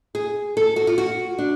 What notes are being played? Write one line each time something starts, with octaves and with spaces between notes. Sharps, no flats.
G#4
A4
F#4
F4
F#4
D4